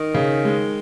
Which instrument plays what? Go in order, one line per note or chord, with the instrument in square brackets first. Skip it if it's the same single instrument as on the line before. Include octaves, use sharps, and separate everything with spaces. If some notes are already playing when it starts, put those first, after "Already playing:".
Already playing: [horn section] D#3
[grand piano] C#3
G#3